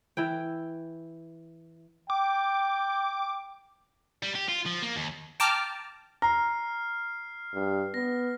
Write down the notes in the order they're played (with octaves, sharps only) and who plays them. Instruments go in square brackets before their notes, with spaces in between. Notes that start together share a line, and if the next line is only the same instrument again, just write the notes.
[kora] E3 E4 G5
[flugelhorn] G5 [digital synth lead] D6
[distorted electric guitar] G3
G4
F4
F3
A#3
D#2
[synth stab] G5 A5 A#5 D6 F6
[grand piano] A#5 [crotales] F6 C7
[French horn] G2
[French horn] B3 [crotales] A#6